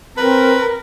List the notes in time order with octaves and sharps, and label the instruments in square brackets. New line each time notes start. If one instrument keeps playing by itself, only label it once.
[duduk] C4 [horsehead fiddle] A#4 [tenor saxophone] B4